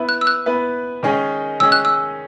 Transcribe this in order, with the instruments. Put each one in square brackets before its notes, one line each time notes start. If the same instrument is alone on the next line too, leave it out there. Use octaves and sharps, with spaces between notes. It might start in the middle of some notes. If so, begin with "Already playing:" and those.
Already playing: [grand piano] B3 E4 B4
[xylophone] F#6
E6
F#6
[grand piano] B3 E4 B4
D#3 G#3 C#4 G#4 D#5
[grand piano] D#3 G#3 C#4 G#4 D#5 [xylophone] E6
[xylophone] F#6
E6